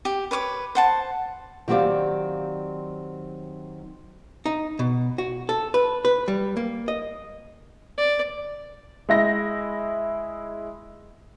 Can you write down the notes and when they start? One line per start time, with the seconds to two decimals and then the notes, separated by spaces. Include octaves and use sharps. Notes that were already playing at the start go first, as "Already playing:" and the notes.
0.05 G4
0.31 B4 C#5 C#6 D6
0.75 C5 F#5 A5
1.68 D#3 F#3 C4 G4 D5 F5
4.46 D#4
4.79 B2
5.18 F#4
5.49 A4
5.74 B4
6.05 B4
6.28 G3
6.57 A#3
6.88 D#5
7.98 D5
9.09 G#3 E4 A#6